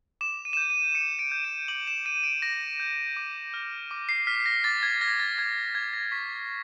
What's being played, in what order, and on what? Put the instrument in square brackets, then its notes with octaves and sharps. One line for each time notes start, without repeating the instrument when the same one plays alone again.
[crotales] D6 E7
D#7
E7
G6 D#7
D#7
D6 C#7
D7
G6
D#7
D6 F#7
E7
G6 D#7
D7
D6 A#6
G6
D6
F6
D6
C7
F6 B6
A#6
D6 A6
G#6
F6 A#6
A6
D6 G#6
F6 G#6
A#6
C#6 B6